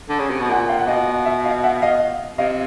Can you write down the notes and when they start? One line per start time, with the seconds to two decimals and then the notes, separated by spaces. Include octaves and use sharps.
0.09 D3
0.19 C#3
0.30 C3
0.40 B2
0.50 A#2 F#5 G#5
0.69 F5 G5
0.79 F#5
0.87 B2 D#5 F5
1.07 D#5
1.25 E5
1.44 D#5 F5
1.63 E5 F#5
1.82 D#5 F5
2.38 C3 D#5 F5